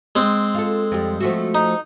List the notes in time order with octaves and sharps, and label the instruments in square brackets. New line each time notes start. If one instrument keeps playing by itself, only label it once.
[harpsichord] G#3 C4
[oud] F4 A4
F2 G3
F3 A3 F#4
[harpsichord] D#4